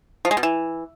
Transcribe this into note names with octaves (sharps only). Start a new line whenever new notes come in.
F3
G#3
B2
E3